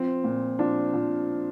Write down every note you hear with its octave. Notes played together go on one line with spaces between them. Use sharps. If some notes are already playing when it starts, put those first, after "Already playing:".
Already playing: F3 C4
A#2
F3 D4
F3